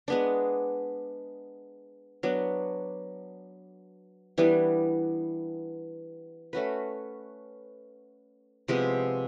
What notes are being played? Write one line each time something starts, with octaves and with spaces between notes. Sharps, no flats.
G#3 B3 D4
F#3 B3 D4
E3 G3 B3 D4
A3 C#4 F#4 B4
C3 F3 G#3 B3